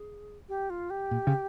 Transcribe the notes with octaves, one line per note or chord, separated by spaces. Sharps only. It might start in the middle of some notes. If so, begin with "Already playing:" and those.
Already playing: G#4
G4
F4
G4
A#2
C#3